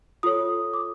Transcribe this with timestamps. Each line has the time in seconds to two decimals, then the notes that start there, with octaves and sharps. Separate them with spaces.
0.23 F4 A4 C#5 D#6
0.74 D6